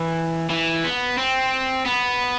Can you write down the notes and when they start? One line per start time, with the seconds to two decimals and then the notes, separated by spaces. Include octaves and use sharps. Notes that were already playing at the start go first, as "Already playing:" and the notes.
Already playing: E3
0.50 E3
0.84 B3
1.18 C4
1.86 B3